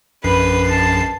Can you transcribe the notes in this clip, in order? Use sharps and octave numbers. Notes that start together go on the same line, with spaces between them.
A#1 F#2 B4 C7
A5